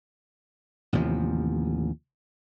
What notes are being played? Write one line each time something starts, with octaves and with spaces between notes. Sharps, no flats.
A1 D#2 C3 F3